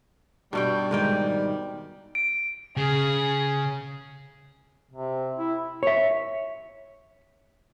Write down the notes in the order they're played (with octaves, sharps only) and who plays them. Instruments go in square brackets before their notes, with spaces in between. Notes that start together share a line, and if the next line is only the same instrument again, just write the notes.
[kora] G2 B2 G5 [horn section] G3
[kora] G#2 D#3 G5
[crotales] D7
[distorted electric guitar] C#3 [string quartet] G#4
[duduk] C3
E4
[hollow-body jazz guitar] C#5 E5